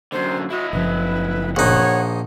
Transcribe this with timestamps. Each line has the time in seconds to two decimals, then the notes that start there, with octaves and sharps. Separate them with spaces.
0.12 F#2 D3 C5
0.50 E4 F#4 D#5
0.73 F#1 C#3 F3 B4
1.56 A#1 D#4 C#5 F#5